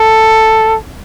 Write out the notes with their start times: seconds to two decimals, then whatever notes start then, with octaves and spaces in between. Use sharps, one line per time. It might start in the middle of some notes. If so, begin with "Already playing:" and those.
Already playing: A4